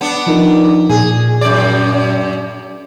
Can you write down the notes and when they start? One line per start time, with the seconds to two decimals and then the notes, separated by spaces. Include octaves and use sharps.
0.01 B3 D4
0.27 F3 D#4 A#4
0.89 A#2 G#4
1.41 F#2 D5